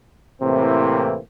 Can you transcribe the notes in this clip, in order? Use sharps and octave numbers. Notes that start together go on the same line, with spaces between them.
A2 C3 E3 A#3 C4